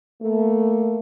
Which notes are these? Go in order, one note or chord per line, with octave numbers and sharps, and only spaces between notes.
A3 A#3